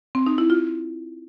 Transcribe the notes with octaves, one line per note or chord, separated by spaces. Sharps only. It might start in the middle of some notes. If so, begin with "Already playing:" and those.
C4
D#4
E4
F4